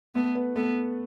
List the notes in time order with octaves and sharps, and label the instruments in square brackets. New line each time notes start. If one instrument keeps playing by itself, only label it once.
[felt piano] A3 A4 [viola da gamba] B3
[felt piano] B3 B4
[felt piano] A3 A4 [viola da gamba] B3